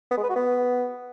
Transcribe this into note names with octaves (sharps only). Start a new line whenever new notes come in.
B3
G#3
B4
F#4
B3